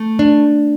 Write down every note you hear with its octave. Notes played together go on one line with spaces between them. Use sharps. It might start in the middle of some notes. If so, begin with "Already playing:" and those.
Already playing: A3
D4